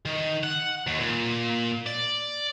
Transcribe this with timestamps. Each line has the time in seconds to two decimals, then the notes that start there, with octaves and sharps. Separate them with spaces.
0.06 D#3
0.43 F#5
0.87 D#2
1.00 A#2
1.86 D5